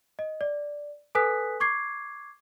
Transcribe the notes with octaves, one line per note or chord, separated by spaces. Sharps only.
D#5
D5
A4 B4 G#5 D#6 F#6 B6
C#6 D6 G#6 C7